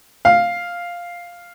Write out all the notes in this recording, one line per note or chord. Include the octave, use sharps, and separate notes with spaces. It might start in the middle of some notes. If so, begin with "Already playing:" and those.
F5